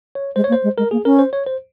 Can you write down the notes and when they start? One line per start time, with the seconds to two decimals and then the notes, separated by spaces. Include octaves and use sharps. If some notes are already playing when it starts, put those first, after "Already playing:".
0.15 C#5
0.36 G#3 C5
0.44 C#5
0.49 A#3
0.52 C5
0.64 G#3
0.78 G#3 A#4
0.91 A#3 G#4
1.05 C#4 A#4
1.19 C5
1.33 C#5
1.47 C5